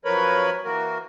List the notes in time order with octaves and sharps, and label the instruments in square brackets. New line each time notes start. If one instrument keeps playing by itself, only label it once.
[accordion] F#2 F3 A#4 B4 C#5 B5
E3 A#3 F#4 A#4